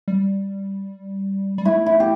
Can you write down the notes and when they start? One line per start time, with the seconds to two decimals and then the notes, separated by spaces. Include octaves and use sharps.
0.08 G3
1.58 G3
1.65 A3 E4
1.86 E4
2.00 G4